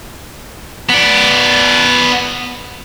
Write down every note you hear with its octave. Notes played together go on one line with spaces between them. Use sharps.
B3 D5